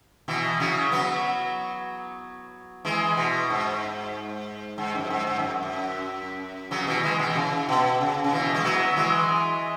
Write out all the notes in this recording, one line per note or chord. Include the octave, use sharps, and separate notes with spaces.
B2 E3
C#3 F#3
F#3 B3
E3 G#3
B2
G#2
G#2
F#2
G#2
G#2
F#2
F#2
C#3 F#3
B2 E3
E3 G#3
B2 E3
B2
C#3
B2
C#3
C#3
B2 E3
G#3
F#3 B3
E3 G#3